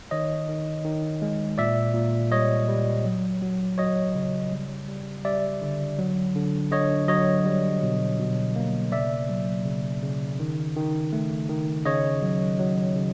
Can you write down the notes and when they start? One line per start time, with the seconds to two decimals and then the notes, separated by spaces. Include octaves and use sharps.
0.11 D#3 C#5 D#5
0.48 D#3
0.84 D#3
1.22 G#3
1.58 A#2 D5 E5
1.94 A#2
2.31 G3 C#5 D#5
2.68 G3
3.05 F#3
3.42 F#3
3.78 F#3 C#5 D#5
4.15 C#3
4.52 G3
4.88 G3
5.24 G3 D5 E5
5.62 D3
5.99 F#3
6.35 D3
6.71 D3 C#5 D#5
7.08 F#3 C#5 D#5
7.45 G3
7.83 B2
8.19 B2
8.56 A#3
8.92 C#3 D5 E5
9.29 F#3
9.65 C#3
10.03 C#3
10.40 D#3
10.76 D#3
11.13 A3
11.49 D#3
11.85 C#3 C#5 D#5
12.22 F#3
12.59 F#3
12.96 C#3